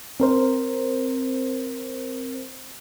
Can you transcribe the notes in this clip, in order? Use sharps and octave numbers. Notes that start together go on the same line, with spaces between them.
C4 A#4 C5